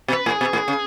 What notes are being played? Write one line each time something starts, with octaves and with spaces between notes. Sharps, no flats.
B2
B4
A2 G#4
B2
A2
C#3